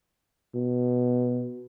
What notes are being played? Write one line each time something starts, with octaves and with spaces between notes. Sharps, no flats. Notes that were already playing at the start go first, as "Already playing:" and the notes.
B2